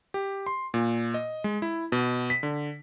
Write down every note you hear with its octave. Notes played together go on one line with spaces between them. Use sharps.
G4
C6
A#2
D#5
G#3
E4
B2
B6
D3